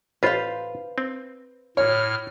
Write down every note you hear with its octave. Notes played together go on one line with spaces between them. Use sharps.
A1 F4 B4 C5 F5
C4
A2 C#5 F6